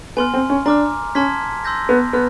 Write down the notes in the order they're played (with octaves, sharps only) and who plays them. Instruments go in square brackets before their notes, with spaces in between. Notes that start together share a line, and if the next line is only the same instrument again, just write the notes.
[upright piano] B3 [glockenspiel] G#5 C6 F6
[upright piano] C4
C#4
[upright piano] D4 [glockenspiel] A#5 D6 F6
[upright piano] C#4 [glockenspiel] A5 C6 F6 G#6 B6
[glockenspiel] C6 E6 G6 A#6
[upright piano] B3
[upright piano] B3 [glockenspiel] F6